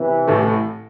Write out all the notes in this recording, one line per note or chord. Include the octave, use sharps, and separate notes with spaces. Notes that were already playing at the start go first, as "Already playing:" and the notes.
Already playing: C3 E3
A1 A2 A3